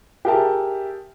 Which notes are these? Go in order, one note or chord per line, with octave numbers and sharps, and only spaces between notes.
G4 G#4 A#4 E5 A5